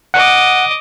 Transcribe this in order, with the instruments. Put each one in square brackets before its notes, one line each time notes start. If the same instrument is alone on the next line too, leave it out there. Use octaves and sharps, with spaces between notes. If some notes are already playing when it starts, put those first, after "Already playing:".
[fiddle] D#5 D6 [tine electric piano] F#5